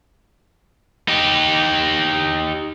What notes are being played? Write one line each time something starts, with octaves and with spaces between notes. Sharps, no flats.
D#4 G4